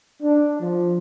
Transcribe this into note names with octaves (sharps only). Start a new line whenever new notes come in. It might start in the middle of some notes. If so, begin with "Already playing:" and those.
D4
F3